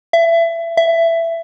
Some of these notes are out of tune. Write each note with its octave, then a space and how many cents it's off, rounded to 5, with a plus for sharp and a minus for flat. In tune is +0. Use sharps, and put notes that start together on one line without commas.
E5 +25
E5 +15